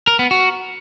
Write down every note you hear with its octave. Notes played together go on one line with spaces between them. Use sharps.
A#4
B3
F#4